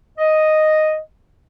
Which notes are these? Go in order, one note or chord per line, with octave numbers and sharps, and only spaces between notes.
D#5